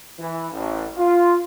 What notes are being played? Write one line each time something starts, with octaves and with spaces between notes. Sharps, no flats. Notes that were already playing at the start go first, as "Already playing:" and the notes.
E3
A1
F4